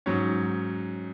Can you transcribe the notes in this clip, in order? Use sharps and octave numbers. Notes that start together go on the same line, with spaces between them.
G#2 F#3 C#4